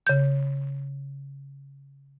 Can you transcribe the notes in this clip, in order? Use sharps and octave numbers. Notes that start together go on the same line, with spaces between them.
C#3 G6